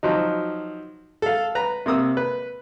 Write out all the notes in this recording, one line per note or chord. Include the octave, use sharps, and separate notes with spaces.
F3 F#3 D#4
A4 F5
B4 A#5
C3 A#3 D#6 E6
B4